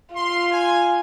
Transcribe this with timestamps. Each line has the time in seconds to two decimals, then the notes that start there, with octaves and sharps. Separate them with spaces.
0.15 F4 C6
0.50 G#5